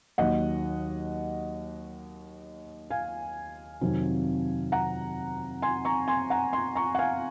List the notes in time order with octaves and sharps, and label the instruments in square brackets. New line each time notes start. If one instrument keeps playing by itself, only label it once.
[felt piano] D#2 D#3 F#3 D#5 F#5
F5 G#5
F2 C3 D#3 F#3
F#5 A#5
G#5 C6
A#5 C#6
G#5 C6
F#5 A#5
G#5 C6
A#5 C#6
F#5
F5 G#5